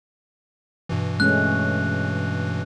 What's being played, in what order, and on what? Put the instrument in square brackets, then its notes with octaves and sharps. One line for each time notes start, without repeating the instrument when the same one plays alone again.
[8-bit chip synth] G2 B2 E3
[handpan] G#3 A3 C#4 [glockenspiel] F#6